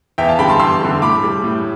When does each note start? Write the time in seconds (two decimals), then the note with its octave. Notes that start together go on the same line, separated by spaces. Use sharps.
0.18 E2 E5 G5
0.28 F5 A5
0.39 D3 G3 G5 B5
0.49 A5 C6
0.59 E2 C6 E6
0.82 D3 G3
1.02 A2 B5 D6
1.24 G3
1.44 A2